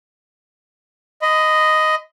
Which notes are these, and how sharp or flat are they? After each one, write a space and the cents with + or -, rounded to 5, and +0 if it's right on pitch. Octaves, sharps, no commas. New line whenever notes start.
D#5 +0 B5 +35